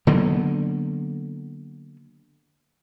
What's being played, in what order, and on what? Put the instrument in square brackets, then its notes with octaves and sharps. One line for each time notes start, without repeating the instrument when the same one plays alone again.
[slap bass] D3 F#3 A#3 B3